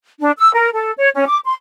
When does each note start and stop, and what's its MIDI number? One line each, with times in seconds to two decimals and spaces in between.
0.19 0.31 62
0.38 0.53 88
0.54 0.68 70
0.73 0.91 69
0.99 1.09 73
1.15 1.24 61
1.27 1.38 86
1.45 1.53 84